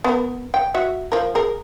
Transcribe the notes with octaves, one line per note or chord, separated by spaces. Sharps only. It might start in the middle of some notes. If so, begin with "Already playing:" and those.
B3 A#4
G5
F#4 E5
F3 A#4
G#4 A#4